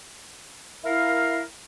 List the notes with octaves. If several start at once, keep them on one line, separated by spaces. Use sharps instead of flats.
E4 A#4 F5